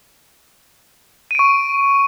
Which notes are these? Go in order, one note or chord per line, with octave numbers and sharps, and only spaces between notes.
C#6 D7 D#7